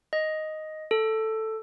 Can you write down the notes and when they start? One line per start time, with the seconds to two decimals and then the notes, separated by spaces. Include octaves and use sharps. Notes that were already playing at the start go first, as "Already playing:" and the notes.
0.13 D#5
0.91 A4